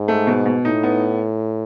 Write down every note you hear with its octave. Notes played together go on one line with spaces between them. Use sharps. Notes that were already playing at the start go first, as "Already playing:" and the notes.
Already playing: G#2
A3
B2
B2
A2 D#4
B3